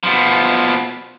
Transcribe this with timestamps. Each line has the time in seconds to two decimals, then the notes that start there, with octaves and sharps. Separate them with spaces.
0.03 B2 F3